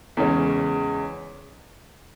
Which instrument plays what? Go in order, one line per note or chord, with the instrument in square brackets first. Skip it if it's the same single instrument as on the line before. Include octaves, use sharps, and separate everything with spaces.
[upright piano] E2 C#3 G#3 C#4